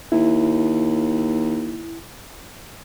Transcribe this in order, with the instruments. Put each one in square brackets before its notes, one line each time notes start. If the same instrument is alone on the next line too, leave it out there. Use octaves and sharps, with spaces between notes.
[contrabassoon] D#2 [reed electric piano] E4